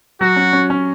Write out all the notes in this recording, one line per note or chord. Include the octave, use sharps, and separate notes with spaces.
F#3 F#4
C#4
C#4
C#4